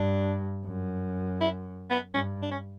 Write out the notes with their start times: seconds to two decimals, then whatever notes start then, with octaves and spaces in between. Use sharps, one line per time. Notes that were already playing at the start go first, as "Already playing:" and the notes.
Already playing: G2 D4
0.66 F#2
1.41 E4
1.90 B3
2.14 G2 C#4
2.42 D4
2.51 C#4